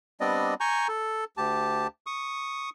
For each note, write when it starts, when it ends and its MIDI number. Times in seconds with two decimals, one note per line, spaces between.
0.21 0.54 55
0.21 0.54 59
0.21 0.54 60
0.21 0.54 62
0.21 0.54 74
0.21 0.54 75
0.60 0.87 80
0.60 0.87 82
0.60 0.87 85
0.60 0.87 91
0.88 1.24 69
1.37 1.87 38
1.37 1.87 67
1.37 1.87 81
2.06 2.70 85
2.06 2.70 87